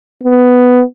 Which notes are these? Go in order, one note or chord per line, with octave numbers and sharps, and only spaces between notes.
B3